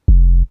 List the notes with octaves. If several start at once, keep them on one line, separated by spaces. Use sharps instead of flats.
F1